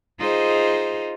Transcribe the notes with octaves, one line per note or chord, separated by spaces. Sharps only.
D#4 F4 G#4 C5 D#5